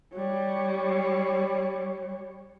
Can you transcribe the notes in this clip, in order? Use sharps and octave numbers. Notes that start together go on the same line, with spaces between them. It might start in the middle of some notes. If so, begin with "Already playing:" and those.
G3 C#5